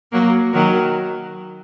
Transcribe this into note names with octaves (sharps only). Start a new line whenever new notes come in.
F#3 A#3
D#3 F#3